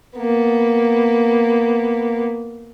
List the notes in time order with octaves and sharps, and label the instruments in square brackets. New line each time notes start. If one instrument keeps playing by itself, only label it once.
[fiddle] A#3 B3